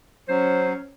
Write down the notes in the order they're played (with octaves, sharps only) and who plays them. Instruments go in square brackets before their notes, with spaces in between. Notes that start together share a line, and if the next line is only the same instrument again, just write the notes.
[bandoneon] F#3 [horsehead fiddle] C#4 [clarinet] C5